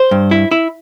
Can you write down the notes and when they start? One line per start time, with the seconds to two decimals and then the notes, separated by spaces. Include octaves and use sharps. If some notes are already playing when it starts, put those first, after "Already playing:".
Already playing: C5
0.11 G2
0.31 E4
0.51 E4